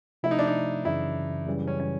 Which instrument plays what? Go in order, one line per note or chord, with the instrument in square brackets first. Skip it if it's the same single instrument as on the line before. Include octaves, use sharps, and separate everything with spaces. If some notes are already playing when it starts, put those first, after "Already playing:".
[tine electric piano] C3 F3 A3 [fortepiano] E4
[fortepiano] D#4
D4
D#4
[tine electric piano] F#2 C#3 E3 [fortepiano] E4
[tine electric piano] F#2 C#3 E3 G3
[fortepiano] C#4
C#4